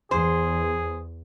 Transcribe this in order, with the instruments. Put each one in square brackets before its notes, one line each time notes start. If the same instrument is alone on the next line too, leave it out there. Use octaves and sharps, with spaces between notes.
[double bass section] E2 [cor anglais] G#4 [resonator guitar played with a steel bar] C5